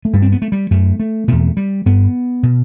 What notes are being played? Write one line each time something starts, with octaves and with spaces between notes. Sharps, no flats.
A3
G2 G3
C4
B3
A3
G3
F#2 A3
A3
E2 B2 A3
G3
G2 B3
B2